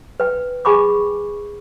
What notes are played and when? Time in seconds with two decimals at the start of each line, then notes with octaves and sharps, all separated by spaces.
0.20 B4 G5
0.65 G#4 G5 G#5 B5 C#6 D6